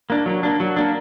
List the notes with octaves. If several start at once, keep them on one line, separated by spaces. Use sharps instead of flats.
A#3 D4
F#3
A#3 D4
F#3
A#3 D4